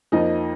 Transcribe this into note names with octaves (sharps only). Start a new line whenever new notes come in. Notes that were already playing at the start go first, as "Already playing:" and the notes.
F2 F3 A#3 D#4 D#5